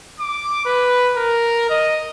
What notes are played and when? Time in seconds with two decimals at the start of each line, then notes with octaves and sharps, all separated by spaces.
0.20 D6
0.65 B4
1.16 A#4
1.70 D#5